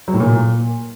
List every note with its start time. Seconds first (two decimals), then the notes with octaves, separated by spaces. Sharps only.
0.08 F#3
0.14 A2
0.20 A#2